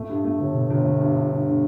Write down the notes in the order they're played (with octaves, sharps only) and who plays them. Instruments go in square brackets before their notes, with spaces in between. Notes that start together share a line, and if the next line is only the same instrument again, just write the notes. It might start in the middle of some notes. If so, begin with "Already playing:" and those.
Already playing: [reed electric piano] A2 [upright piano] A3
[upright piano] G2
A3
G1
[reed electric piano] B2 [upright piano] D3
[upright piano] G1
A3
G2
G2
G2
D3